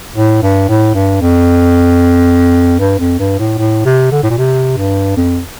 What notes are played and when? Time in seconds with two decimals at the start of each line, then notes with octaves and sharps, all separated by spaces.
0.16 A2
0.43 G2
0.69 A2
0.95 G2
1.21 F2
2.80 G2
2.99 F2
3.19 G2
3.39 A2
3.59 A2
3.86 C3
4.12 D3
4.23 A2
4.31 A#2
4.38 C3
4.78 G2
5.17 F2